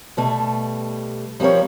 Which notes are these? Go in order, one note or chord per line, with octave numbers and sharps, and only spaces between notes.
B2 G3 A3
F3 G3 C4 A#4 C#5